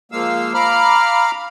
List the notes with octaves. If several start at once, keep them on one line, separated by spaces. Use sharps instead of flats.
F3 G#3 A#3 F5 E6
F5 A#5 B5 D6 F6